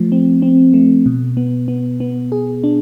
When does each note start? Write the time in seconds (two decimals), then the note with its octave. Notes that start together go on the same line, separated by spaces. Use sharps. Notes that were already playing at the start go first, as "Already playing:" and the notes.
Already playing: F3 A3
0.12 C4
0.42 C4
0.74 A3
1.06 B2
1.37 B3
1.68 B3
2.00 B3
2.32 G#4
2.64 D4